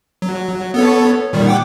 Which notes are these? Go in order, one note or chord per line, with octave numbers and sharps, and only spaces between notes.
F#3
B3 A4 C#5
A#2 D#3 G3
F#5 G5 D6